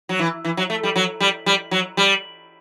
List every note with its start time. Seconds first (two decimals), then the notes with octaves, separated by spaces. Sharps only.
0.09 F#3
0.19 E3
0.45 E3
0.57 F#3
0.70 A3
0.83 G3
0.96 F#3
1.20 G3
1.46 G3
1.71 F#3
1.97 G3